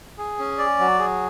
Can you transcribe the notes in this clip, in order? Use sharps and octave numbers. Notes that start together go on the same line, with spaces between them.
G#4
C#4
D5
F#3
G#4